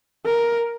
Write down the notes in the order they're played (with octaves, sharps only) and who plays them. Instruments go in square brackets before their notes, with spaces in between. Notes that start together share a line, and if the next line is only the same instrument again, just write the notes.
[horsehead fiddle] A#4